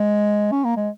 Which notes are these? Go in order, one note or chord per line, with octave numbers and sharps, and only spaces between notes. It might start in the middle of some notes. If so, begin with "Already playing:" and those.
Already playing: G#3
C#4
A#3
G#3